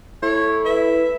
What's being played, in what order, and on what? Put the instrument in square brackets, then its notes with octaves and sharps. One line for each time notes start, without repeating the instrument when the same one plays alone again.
[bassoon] A3 [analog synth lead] E4 [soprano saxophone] C#5
[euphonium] B4 [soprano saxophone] E5